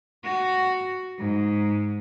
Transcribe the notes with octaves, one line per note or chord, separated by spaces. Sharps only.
F#4
G#2